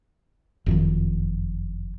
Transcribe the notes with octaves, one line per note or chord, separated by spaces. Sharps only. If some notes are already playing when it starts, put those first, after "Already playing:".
F#1 F2 D#3